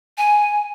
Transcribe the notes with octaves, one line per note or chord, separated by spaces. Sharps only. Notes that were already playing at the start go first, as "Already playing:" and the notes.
G#5